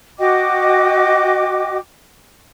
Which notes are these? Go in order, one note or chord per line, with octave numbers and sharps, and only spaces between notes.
F#4 D#5 G5 D6